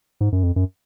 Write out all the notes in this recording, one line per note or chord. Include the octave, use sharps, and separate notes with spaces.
G#2
F#2
F2
F#2